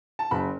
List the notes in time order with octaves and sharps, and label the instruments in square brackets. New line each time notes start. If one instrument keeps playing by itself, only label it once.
[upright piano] A5
F#1 B5